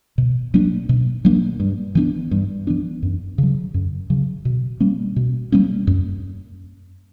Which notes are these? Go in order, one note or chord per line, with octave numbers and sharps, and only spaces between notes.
B2
F#3 A#3 D4
B2
F#3 A#3 D4
G2
E3 B3 D4
G2
E3 B3 D4
F#2
C#3 F#3
F#2
C#3 F#3
B2
G3 A#3 C#4
B2
G3 A#3 C#4
F#2